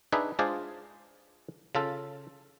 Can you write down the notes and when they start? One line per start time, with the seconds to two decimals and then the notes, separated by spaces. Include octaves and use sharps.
0.12 D4 D#4 G#4 B4 E5
0.39 G#3 D4 F4 G#4 C5 D5
1.75 C#3 F4 A4